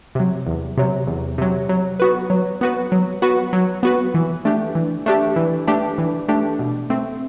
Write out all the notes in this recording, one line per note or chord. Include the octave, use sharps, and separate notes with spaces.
C3 F#3
E2
C3 F#3
E2
C3 F#3
F#3
B3 F#4 B4
F#3
B3 F#4 B4
F#3
B3 F#4 B4
F#3
B3 F#4 B4
E3
A3 D4 G4
E3
A3 D4 G4
E3
A3 D4 G4
E3
A3 D4 G4
B2
A3 C4